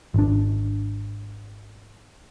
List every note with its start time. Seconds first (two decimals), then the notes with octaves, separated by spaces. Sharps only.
0.14 G#1 D4